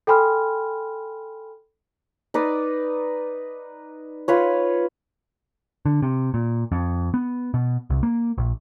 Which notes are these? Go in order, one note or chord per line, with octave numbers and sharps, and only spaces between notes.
A4 G5 G#5 B5 C6 F6
D#4 B4 D5
F4 B4 C#5
D3
C3
A#2
F2
B3
B2
C2
A#3
A#1